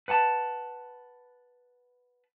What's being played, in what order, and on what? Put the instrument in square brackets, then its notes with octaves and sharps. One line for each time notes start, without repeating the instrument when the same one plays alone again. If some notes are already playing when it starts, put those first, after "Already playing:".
[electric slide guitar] B4 F#5 G#5 A5